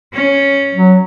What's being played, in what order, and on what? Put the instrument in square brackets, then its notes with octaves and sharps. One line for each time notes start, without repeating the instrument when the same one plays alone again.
[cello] C#4
[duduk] F#3